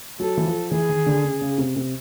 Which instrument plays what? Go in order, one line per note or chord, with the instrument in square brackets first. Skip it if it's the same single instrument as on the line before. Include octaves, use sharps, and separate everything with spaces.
[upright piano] F#3 [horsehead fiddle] A4
[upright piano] E3
F3
[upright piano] E3 [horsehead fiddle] G#4
[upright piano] D#3
D3
C#3
C#3
C3
C3